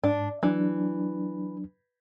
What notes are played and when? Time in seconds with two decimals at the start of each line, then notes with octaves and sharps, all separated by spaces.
0.04 G#2 D4
0.43 E3 F#3 D4